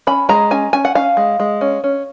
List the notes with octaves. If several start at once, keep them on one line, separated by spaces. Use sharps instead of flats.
C#4 B5
G#3 A#5
C#4 G#5
C#4 G#5
F#5
C#4 F5
G#3
G#3
C#4
C#4